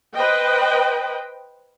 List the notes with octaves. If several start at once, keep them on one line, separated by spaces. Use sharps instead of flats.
B4 C5 D#5 G5